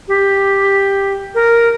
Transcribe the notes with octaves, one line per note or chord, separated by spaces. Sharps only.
G4
A#4